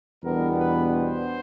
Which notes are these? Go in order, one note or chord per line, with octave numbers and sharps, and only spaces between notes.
E2 B2 G3 B3 D4 A#4
B4
C5